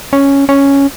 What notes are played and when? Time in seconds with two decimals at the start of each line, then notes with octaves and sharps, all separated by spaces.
0.13 C#4
0.49 C#4